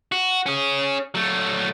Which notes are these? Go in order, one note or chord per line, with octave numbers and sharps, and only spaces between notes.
F#4
C#4 G#4
F#3 A3